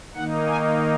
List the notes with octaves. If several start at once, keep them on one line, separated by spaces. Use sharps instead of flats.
D#3 A#3 D#4 F#5
G#5